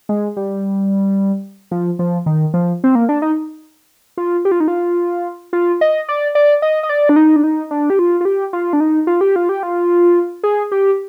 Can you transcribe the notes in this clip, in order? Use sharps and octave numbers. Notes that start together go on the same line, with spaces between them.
G#3
G3
F3
F3
D#3
F3
C4
A#3
D4
D#4
F4
G4
F4
D#4
F4
F4
D#5
D5
D5
D#5
D#5
D5
D4
D#4
D4
D#4
D4
G4
F4
F4
G4
F4
D4
D#4
F4
G4
F4
G4
F4
G#4
G4